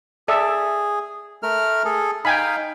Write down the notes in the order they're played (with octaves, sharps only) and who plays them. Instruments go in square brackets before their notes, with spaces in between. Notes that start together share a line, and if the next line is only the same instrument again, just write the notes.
[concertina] G#4 [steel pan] A4 D5 E5
[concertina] A3 A#4 F6
G#4 A4
[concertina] D#4 F5 [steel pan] G5 G#5 B5